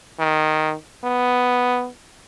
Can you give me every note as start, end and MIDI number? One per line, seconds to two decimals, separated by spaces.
0.19 0.74 51
1.04 1.88 59